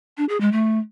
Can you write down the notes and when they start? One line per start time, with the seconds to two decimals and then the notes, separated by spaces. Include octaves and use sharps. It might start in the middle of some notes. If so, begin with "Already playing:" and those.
0.17 D4
0.29 G#4
0.41 G#3
0.52 A3